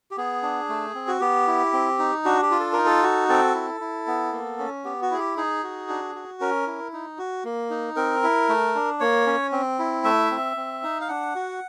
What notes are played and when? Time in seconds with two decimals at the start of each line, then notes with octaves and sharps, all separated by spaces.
0.11 G4
0.17 B3 G#4
0.43 D4
0.69 A3
0.94 C4
1.07 F#4
1.21 B3 G4
1.47 E4
1.73 C4
1.99 D#4
2.25 D4 F#4
2.42 G4
2.51 F4
2.60 A4
2.73 D#4 A#4
2.86 A4
3.03 F#4
3.29 C4 A4
3.54 E4
3.81 E4
4.07 B3
4.32 A#3
4.59 C#4
4.85 B3 G4
5.02 F#4
5.11 E4 G#4
5.19 G4
5.37 D#4 G#4
5.63 F#4
5.89 D4
6.15 F#4
6.40 C#4 A#4
6.67 E4
6.93 D#4
7.18 F#4
7.44 A#3
7.70 D#4
7.96 C4 A#4
8.23 E4
8.49 A3
8.75 D4
9.00 A#3 C#5
9.26 C#4
9.52 C4
9.79 E4
10.04 A3 E5
10.31 C4
10.57 C4
10.83 D#4
11.01 F5
11.08 D4 F#5
11.35 F#4